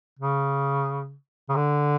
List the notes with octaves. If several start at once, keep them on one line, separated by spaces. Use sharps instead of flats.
C#3
C#3
D3